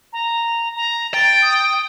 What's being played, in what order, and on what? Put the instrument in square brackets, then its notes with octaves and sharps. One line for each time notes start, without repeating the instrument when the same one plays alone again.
[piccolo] A#5
A#5
[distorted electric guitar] G5 [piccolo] A6
[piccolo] D#6